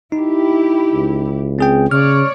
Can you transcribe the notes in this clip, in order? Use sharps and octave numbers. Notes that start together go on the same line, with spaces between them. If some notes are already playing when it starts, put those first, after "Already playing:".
D#4 E4 G4
C#2
C4 G#4 G5
C#3 C#5 D5 F6